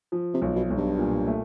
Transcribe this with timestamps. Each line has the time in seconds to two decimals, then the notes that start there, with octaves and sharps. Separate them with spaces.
0.12 F3
0.34 C3
0.42 B1
0.56 B2
0.70 B1
0.77 G2
0.98 A#2
1.27 A3